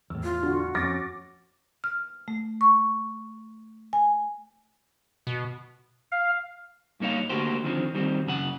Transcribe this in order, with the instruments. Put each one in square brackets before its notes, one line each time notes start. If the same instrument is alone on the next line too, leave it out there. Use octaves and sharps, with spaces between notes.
[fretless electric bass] E2 A2 [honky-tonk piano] E6
[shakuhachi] F4
[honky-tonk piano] D3 [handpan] F#4
[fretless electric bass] F2 [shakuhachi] C#4 [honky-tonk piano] D6 A6 A#6
[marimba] F6
A3
C#6
G#5
[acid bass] B2
[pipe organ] F5
[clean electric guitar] G2 A#3 D#4 C#5 F5
D3 A3 A#3 F#4 G4 C5
D3 D#3 F3 C4
D#2 D#3 G3 C4
F#2 C#3 G#4 F#5